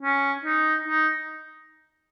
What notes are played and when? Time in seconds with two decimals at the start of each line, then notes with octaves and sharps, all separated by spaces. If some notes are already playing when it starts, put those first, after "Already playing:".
0.02 C#4
0.45 D#4
0.88 D#4